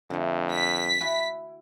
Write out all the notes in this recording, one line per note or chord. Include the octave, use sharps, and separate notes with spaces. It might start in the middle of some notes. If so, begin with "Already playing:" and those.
F2 D3 A3
B6
E4 F#4 G#5